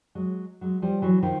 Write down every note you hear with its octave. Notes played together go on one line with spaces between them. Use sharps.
F#3 G#3
F#3 G#3
F3 G3
E3 F#3
D#3 F3